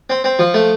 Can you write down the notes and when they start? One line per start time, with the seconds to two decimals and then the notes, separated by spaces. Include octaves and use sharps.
0.10 C4
0.24 C4
0.39 F3
0.54 A3